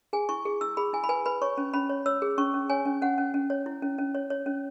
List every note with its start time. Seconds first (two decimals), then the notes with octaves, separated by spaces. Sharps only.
0.13 G#4 G#5
0.29 E4 C#6
0.45 G#4
0.61 E4 E6
0.77 G#4 B5
0.93 E4 G#5
1.04 B5
1.09 B4 G#5
1.26 B4 B5
1.42 C#5 C#6
1.57 C#4
1.74 C#4 B5
1.89 C#5
2.06 C#5 E6
2.22 G#4
2.38 C#4 C#6
2.54 C#4
2.70 C#5 G#5
2.86 C#4
3.02 C#4 F#5
3.18 C#4
3.34 C#4
3.50 C#5
3.66 E4
3.82 C#4
3.98 C#4
4.15 C#5
4.30 C#5
4.46 C#4